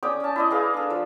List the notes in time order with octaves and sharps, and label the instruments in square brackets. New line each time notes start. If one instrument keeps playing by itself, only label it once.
[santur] C#4 D5 G5 D#6
C#4 A5
E4 D5 D#5
G#4 B4 F5
D4 A4
F3